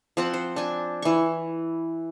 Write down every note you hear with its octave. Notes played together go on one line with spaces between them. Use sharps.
F3 C4 F#5
C5
D4 G#5
E3 C#6